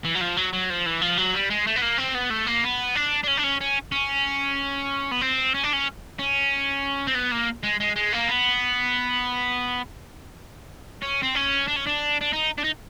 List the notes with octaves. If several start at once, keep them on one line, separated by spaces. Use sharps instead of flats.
E3
F#3
F3
F#3
F#3
F3
E3
F3
F#3
G3
G#3
A3
B3
A#3
C4
B3
A3
A#3
B3
D4
D4
C#4
D4
C#4
C#4
C#4
B3
C4
C#4
D4
C#4
C#4
C4
B3
A#3
G#3
G#3
G#3
A#3
B3
C#4
C4
C#4
D4
C#4
D4
D4
D#4
D4
D#4